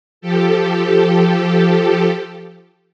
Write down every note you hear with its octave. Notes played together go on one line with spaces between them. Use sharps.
F3 G4 A4